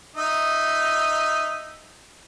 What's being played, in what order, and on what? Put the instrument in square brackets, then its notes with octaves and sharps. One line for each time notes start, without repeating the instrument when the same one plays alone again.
[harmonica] D#4 E5